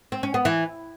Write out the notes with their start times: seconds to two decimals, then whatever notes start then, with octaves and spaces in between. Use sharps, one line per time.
0.12 C4
0.23 C#4
0.34 B3
0.45 E3